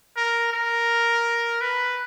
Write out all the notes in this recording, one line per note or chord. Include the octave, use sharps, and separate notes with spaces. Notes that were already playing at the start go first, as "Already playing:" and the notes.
A#4
A#4
B4